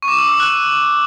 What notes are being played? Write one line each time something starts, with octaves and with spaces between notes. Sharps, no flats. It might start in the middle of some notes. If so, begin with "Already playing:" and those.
C#6
D6
E6
E6
F#6